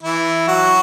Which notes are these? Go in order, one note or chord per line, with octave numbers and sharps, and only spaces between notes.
E3 E4
F#3 F#4